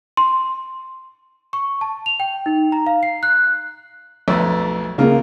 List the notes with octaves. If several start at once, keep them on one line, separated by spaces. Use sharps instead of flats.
C6
C#6
A5
F7
G5
D#4
A#5
F5
C7
F#6
B1 F2 A3
C#2 C#3 A#3 F4 A#4